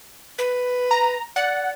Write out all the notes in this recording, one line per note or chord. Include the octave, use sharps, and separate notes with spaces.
B4
A#5
D5 F#5